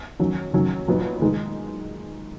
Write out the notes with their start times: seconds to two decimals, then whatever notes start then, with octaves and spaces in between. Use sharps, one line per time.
0.19 D#3 F#3 C#4
0.53 D#3 F#3 C#4
0.88 A#2 F#3 B3 D#4
1.21 D#3 G#3 D#4